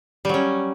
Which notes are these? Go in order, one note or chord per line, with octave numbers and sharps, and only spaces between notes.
F#3 G3 C#4